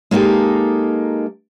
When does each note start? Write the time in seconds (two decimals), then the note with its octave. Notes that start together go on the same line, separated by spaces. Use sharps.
0.11 G#3 A#3 D#4 G4 A4